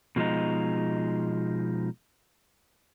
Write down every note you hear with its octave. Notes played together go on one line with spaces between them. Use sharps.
B2 F3 G#3 D#4